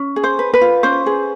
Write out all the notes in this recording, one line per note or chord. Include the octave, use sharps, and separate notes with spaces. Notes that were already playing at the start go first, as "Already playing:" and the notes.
Already playing: C#4
G#4
C5
B4
B4
F4
C#4 C5
G#4